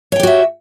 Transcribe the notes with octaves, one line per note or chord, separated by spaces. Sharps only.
F#4 G4 C#5 E5 G5